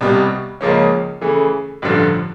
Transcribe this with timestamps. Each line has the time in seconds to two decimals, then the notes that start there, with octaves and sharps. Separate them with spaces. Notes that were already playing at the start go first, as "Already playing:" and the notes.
0.01 C2 B2 G3
0.61 C#2 C#3 F3 A#3 C#4
1.21 C#3 E3 A3
1.82 A1 G2 D3 F3